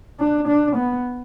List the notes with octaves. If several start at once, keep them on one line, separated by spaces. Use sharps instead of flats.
D4
D4
B3